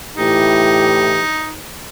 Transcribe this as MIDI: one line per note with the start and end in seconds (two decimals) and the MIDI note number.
0.17 1.22 45
0.17 1.22 52
0.17 1.54 63
0.17 1.22 67